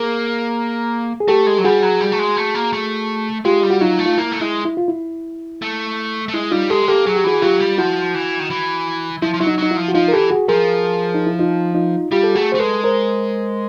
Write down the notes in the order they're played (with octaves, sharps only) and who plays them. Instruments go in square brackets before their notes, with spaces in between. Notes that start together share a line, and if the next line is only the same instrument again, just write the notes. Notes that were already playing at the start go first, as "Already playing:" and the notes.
Already playing: [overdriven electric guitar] A#3 [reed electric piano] G#4 A#4
[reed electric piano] G#4
[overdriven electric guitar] A3 [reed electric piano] G4 A4
[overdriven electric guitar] G#3
F#3
[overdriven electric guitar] G3 [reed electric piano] F#4 G#4
[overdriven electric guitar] F#3
G3
A3
G#3
A3
A#3
A3
[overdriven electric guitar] G#3 [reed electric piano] F4 G4
[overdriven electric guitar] G3
[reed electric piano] F#4
[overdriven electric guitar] F#3 [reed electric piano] D#4 F4
[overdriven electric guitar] A3
[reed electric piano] F4
[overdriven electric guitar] A#3 [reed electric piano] E4
[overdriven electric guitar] A3
[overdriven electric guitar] G#3 [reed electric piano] E4
[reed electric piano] E4
F4
E4
[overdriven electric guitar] A3
A3
[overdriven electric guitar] G#3 [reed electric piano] E4
[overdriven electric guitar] G3 [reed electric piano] D#4 F4
[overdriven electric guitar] G#3 [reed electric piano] G4 A4
[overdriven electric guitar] A#3 [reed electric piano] G4 A4
[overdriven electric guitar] F#3 [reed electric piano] G#4
[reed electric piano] G4
[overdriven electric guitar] E3 [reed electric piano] F#4 G#4
[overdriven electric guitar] F#3 [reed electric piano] F4 G4
[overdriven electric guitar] G3
[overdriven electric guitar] F3 [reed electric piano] E4 F#4
[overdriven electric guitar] E3
D#3
E3
[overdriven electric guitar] F3 [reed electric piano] E4
[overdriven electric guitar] F3
[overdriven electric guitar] F#3 [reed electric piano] E4
[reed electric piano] D#4
[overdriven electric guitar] F#3 [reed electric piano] D#4
[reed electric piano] E4
[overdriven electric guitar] F3
[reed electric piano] F#4
[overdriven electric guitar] F3 [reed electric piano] D#4 F4
[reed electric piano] A#4
[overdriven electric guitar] E3 [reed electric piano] G4 A4
[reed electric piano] F#4 G#4
[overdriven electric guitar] F3 [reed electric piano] G#4 A#4
[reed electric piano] D#4
E4
D#4 F4
D#4 F4
[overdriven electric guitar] G3 [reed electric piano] F4 G4
[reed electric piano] A4
[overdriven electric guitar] A3 [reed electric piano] F#4 G#4
[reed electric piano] C5
[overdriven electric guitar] A3
[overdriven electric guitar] G#3 [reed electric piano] A4 B4
[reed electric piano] A#4 C5